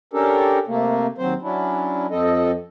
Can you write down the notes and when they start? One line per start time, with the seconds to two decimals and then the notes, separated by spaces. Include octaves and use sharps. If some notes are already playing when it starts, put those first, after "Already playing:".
0.13 C#4 D4 G4 A4 A#4
0.67 C3 A3 A#3
1.18 D#2 F#3 C4 C5
1.42 F#3 C#4 D4 E4
2.11 F2 F3 C4 A4 D#5